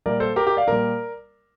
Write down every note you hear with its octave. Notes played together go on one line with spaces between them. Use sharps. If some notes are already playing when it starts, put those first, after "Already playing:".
A#2 G3 A#4 D5
A4 C5
G4 A#4
G4 A#4
D5 F5
A#2 G3 A#4 D5